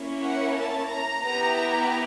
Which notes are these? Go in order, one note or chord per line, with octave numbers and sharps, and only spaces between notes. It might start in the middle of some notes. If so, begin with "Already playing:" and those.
Already playing: A#3 C#4 E4
F#5
A5
A#5
B3 E4 G4 A#5
A#5